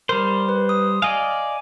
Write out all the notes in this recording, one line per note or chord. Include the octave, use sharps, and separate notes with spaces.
G3 A#4 C5
B4
D#6
D5 D#5 F5 G#5